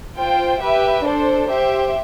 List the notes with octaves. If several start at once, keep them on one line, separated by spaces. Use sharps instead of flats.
F4 C5 G5
G4 B4 E5
D4 A4 C5
G4 C5 E5